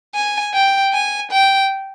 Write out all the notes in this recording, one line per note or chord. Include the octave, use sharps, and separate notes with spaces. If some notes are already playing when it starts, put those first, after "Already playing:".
G#5
G5
G#5
G5